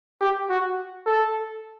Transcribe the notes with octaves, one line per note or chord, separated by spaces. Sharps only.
G4
F#4
A4